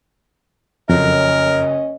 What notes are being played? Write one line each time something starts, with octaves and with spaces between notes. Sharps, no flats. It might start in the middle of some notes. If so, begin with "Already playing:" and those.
F#1 F2 F#3 C#4 A#4 D#5